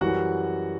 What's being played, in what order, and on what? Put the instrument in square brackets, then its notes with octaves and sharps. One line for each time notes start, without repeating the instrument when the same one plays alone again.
[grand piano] F#2 E3 G3 F#4 F#5